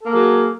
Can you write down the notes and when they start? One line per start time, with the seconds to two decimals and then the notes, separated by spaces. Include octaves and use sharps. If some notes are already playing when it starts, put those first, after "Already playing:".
0.02 A4
0.06 A#3
0.11 G#4
0.15 F#3